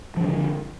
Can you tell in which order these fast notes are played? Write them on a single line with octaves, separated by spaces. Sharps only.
F3 D4 E3 D3